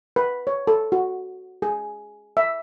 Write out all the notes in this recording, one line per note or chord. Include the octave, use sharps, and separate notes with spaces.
B4
C#5
A4
F#4
G#4
E5